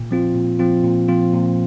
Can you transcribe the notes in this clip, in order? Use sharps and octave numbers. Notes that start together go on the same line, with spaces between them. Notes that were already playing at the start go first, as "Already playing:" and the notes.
Already playing: A#2
F3 C4 F4
A#2
F3 C4 F4
A#2
F3 C4 F4
A#2